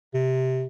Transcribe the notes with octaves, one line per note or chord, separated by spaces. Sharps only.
C3